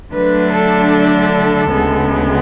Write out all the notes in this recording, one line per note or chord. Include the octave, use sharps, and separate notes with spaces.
D3 F#3 A3 D4 B4
A4
A4
D2 C#3 G#3 B3